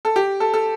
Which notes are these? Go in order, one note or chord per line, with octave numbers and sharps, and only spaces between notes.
A4
G4
A4
A4